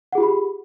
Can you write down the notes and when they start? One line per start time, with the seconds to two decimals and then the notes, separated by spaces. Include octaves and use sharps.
0.13 F#5
0.15 G#4
0.18 F4
0.20 G4
0.23 B5